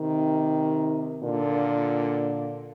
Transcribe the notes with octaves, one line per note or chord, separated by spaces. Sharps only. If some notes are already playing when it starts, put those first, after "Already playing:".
Already playing: C3 D#3
A#2 D3